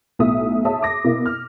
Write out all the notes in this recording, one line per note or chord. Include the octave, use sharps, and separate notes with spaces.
B1 A2 E5 D#6
G#4 C#5 E5 A5 D#6
D6 A#6
B2 A#3 E4
F6